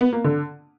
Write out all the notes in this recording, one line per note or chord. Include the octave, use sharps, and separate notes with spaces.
B3
A#3
D3